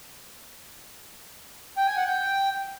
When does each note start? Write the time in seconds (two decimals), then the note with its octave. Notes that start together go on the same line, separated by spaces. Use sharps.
1.77 G5
1.87 G#5
1.97 F#5
2.07 G5